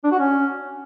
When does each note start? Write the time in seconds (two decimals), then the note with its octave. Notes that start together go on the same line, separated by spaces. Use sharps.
0.04 D4
0.12 F#4
0.19 C#4